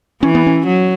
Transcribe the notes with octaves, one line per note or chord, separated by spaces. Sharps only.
E3 C#4
B3
C#4
F#3